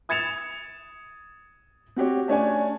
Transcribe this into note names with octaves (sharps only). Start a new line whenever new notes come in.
D#6 G#6 A6 C#7 E7 F7
C4 F#4 G4 C#5
A3 C#4 D4 G#5